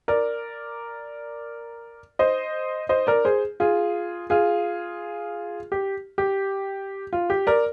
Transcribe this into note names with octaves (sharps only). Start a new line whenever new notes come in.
A#4 D5
C5 D#5
C5 D#5
A#4 D5
G#4 C5
F4 G#4
F4 G#4
G4
G4
F4
G4
A#4 D5